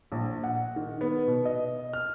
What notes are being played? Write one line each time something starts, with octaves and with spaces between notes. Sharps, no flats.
A#1
F#5
D#3
B3
B2
D#5
F6